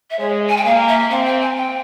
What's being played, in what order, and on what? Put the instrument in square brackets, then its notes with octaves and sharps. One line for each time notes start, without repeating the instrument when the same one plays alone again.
[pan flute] E5
[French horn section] G#3 [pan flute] C#5
[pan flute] G#5
G5
[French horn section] A#3 [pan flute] F5
[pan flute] E5
[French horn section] C4 [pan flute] F5
[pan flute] G5
G#5
G5